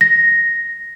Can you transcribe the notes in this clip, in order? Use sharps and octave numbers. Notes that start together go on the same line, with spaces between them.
A#6